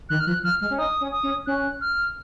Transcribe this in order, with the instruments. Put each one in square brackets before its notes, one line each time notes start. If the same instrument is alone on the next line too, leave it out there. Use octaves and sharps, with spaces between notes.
[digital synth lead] D#3 [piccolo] F#6
[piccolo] F6
[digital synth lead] F3 [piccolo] F#6
[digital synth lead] F3 [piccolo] F6
[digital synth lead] G#3 [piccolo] F6
[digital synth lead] C#4
[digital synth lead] D#4 [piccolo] D#6
[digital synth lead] C#4
[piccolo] D#6
[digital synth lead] C#4
[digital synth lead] C#4 [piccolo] F#6
[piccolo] F6